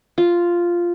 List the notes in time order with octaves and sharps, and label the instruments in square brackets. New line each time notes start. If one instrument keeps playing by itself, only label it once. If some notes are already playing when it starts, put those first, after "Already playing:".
[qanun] F4